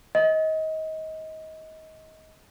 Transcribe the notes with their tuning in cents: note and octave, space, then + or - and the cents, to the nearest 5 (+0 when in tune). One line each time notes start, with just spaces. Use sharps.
D#5 +25